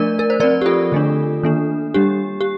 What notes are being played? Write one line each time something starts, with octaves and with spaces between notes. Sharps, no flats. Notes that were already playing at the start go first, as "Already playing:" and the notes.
Already playing: F3 A3 D4 A#4 D5
A#4
C5
F3 C4 A#4 D5
G4
F4 A4
D3 A3 D4
D#3 A#3 D4
G3 D4 G4
G4